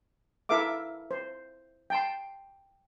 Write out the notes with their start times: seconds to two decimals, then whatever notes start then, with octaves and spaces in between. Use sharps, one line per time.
0.49 E4 A4 A#4 E5 F5 D6
1.11 C5
1.90 G5 A5 C6